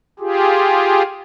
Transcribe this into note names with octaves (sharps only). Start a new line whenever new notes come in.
F4 G4 G#4